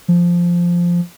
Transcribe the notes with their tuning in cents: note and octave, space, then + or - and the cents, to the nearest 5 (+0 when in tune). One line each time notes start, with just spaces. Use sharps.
F3 -5